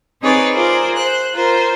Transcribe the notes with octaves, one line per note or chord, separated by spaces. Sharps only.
C4 D#4 G#4 B4 C#5 D5
F4 G#4 A#4 C5 D5
C5 F#6
F4 A#4 C5